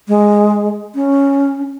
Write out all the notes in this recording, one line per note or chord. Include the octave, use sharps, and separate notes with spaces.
G#3
C#4